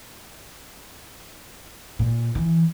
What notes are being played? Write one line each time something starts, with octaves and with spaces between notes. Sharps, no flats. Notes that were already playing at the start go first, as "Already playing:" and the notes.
A#2
E3